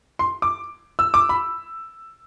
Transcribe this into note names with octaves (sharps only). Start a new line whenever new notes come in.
C6
D6
E6
D6
B5